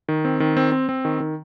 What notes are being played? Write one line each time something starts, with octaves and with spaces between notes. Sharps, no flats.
D#3
C4
D#3
C4
C4
C4
D#3
D#3